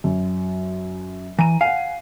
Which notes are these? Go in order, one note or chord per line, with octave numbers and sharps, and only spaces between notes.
F#2
E3 A#5 D#7
F5 F#5 G#5